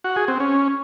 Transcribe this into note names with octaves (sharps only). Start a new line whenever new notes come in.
F#4
G#4
C4
C#4